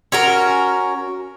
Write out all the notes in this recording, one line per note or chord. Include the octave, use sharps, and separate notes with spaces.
C#4 F#4 A#4